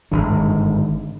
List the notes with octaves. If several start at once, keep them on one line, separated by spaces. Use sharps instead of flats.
G#1 G2 D3